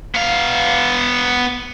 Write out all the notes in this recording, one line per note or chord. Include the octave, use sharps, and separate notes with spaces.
B3 F5